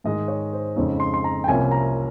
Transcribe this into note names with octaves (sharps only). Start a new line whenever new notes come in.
G#2 D#3 G#3 D#4 D#5
C#5
C5
F2 C#3 G#3 C4 D#4 C#5
C6
C6
A#5
G5
C2 C3 F3 A#3 C#4 G#5
A#5